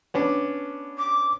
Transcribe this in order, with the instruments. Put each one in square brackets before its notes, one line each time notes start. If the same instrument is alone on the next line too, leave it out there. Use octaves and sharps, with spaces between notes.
[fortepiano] B3 C#4 D4
[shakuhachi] D6